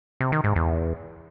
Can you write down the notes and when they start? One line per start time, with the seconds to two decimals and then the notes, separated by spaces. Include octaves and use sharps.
0.21 C3
0.32 D#3
0.44 G#2
0.56 E2